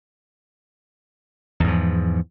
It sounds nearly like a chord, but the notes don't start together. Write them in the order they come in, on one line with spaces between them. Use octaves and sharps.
E2 G#2 F3